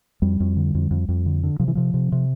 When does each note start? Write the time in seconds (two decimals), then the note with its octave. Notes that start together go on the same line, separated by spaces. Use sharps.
0.22 F2 G3
0.40 F2
0.57 D3
0.75 F2
0.91 F2
1.08 F2
1.26 D3
1.43 D3
1.60 C3 F3
1.68 E3
1.75 C3 F3
1.94 C3
2.12 C3